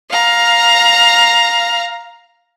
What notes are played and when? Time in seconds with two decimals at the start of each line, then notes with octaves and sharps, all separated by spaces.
0.11 F5 A#5